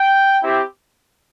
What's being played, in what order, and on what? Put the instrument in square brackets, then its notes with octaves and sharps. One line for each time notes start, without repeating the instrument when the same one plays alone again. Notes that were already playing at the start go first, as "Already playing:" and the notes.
Already playing: [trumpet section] G5
C4 E4 G4